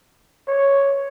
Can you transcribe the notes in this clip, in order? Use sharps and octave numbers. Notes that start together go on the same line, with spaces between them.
C#5